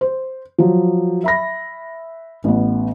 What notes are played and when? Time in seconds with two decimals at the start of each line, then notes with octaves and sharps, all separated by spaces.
0.01 C5
0.58 F3 F#3
1.24 E5 B5 A#6
2.44 A1 B3